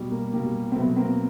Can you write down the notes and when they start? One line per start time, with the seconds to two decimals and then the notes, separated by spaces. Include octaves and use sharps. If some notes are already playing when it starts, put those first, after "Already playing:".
Already playing: B2 G3
0.11 A#3
0.33 B2 G3 A#3
0.72 C4
0.75 B2 A3 B3
0.80 F#3
0.97 A#3 C4